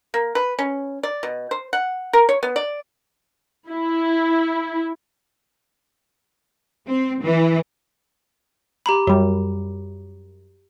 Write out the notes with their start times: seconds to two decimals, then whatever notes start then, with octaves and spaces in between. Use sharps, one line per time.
0.14 A#3
0.35 B4
0.59 C#4
1.03 D5
1.23 B2
1.51 C5
1.73 F#5
2.13 A#4
2.29 C#5
2.43 B3
2.56 D5
3.69 E4
6.88 C4
7.23 E3
8.86 G4 A#5 B5
9.07 F#2 G3